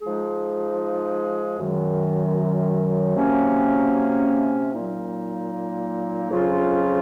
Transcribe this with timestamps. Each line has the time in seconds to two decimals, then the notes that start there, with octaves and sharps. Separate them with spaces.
0.01 F3 G#3 D#4 G#4
1.58 F#2 D#3 F#3
3.15 C3 F#3 A#3 C#4
4.72 A#2 F#3 A#3 D#4
6.30 F2 C#3 F#3 C#4 F4